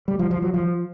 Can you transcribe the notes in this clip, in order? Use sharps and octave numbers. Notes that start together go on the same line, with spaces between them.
G3
F3
F3
F#3
F3